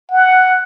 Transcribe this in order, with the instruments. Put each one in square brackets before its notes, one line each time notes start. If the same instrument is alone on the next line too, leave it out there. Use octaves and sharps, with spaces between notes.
[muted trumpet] F#5